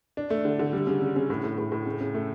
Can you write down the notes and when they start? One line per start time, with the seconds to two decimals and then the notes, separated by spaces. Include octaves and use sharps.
0.17 D4
0.30 A3
0.45 D3
0.59 D3
0.73 G3
0.87 C#3
1.02 C#3
1.16 C#3
1.30 A2
1.44 A2
1.58 A2
1.72 A2
1.86 C#3
2.01 C#3
2.15 A3